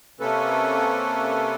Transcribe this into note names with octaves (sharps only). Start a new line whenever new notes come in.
C3 A#3 C#4 A4 B4